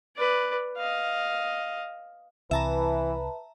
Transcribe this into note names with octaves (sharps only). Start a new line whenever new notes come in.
B4 D5
D#5 F5
C2 E3 B4 E5 A5 A#5